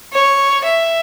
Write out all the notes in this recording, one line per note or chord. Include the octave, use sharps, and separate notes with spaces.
C#5
E5